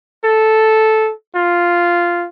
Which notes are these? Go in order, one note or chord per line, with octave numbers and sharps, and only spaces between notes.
A4
F4